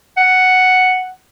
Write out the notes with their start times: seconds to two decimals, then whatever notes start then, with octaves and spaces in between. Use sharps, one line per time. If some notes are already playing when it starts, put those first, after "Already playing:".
0.17 F#5